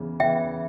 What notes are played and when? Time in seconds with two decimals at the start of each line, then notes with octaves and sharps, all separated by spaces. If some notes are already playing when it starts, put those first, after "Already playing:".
Already playing: E2 C#3 E3
0.20 E2 C#3 E3 E5 G5